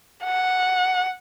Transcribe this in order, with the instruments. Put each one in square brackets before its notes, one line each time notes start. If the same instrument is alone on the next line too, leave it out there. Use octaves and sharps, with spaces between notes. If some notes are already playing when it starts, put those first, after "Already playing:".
[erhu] F#5